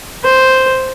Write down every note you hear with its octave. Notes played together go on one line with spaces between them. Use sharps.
C5